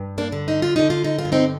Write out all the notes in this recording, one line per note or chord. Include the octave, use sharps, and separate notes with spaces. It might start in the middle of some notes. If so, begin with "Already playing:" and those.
Already playing: G2
A#3 D4
D3
D#4
F4
D3 D#4
F4
D#4
F4
G2
C4 D#4